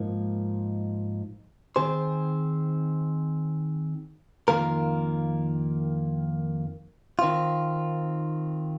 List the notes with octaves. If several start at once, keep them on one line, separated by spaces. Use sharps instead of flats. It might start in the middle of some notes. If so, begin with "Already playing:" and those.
Already playing: G#2 F3 A#3 D#4
D#3 C4 G#4 C5
F2 D#3 A#3 F4 A#4
D#3 C4 F4